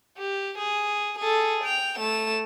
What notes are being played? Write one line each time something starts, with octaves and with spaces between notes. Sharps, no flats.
G4
G#4
G#4 A4
G5 F7
A3 E7